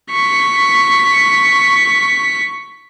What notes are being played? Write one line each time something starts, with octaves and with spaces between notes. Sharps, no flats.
C#6 B6